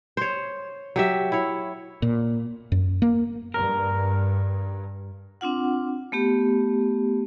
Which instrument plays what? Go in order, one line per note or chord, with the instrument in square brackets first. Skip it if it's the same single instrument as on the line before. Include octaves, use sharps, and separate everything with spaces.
[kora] C5 C#5
F#3 G4 E5
E4 C#5
[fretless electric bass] A#2
F#2
A#3
[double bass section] G2 [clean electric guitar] A#4
[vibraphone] C4 D4 F4 F#5
A3 B3 G4